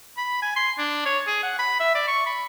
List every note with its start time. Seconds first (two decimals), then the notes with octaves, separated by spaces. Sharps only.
0.17 B5
0.42 G#5
0.56 C6
0.79 D4
1.06 C#5
1.27 G#4
1.43 F#5
1.59 B5
1.80 E5
1.95 D5
2.07 C#6
2.26 B5